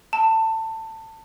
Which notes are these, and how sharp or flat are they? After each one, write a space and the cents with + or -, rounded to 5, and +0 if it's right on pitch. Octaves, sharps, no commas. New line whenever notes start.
A5 +20